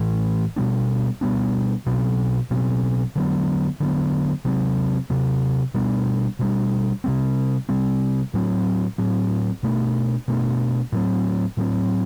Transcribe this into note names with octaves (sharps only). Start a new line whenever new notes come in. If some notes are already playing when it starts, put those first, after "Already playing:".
Already playing: A2 E3 A3
B2 G3 B3 D4
B2 G3 B3 D4
B2 F#3 C4
B2 F#3 C4
D3 F#3 B3
D3 F#3 B3
C3 F#3 C4
C3 F#3 C4
B2 G3 B3 D4
B2 G3 B3 D4
C3 G3 C4
C3 G3 C4
A2 F#3 C4
A2 F#3 C4
B2 A3 D4
B2 A3 D4
A2 F#3 C4
A2 F#3 C4